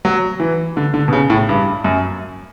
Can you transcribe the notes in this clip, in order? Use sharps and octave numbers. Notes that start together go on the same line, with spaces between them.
F#3
E3
D3
D3
B2
C#3
A2
G2
F#2